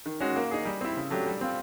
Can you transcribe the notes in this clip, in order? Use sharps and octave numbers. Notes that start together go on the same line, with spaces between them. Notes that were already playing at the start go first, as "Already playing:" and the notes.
D#3
G#3 C#4 F#4
A#3
D#4 G#4
G3
C4 E4
C#3
F#3 A3 D4 G4
G3
C4 F4